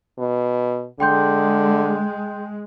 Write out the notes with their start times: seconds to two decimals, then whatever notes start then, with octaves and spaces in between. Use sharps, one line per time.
0.18 B2
1.00 D3 G#3 G5 C6 G6